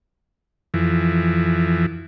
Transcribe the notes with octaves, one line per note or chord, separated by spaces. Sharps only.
F2 E3